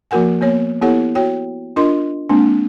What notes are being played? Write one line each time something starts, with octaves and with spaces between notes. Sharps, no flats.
F3 A#3 F#4 A#4 F#5 G#5
A#3 B3 C#5
B3 E4 G4 A4 C#5 F#5
F#4 C#5 G5
D4 F4 A#4 D#5 C6
G#3 A#3 C4 D4